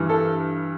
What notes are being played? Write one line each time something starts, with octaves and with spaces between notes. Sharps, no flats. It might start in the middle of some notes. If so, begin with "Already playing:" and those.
Already playing: G2 E3
A4